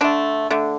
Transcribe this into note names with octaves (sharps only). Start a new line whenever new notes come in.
D3 A3 D4
D3 A3